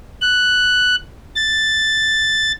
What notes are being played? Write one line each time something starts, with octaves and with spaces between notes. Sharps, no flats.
F#6
A6